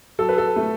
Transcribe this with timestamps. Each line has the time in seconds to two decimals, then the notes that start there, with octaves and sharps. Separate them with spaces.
0.19 F#3 A4
0.29 B4
0.38 A4
0.56 A3